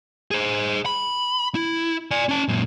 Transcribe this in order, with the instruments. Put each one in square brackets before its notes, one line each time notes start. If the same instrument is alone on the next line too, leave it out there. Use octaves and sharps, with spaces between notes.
[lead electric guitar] G#4 C5
B5
E4
D5 G#5
C#4 A5
F#2 A#2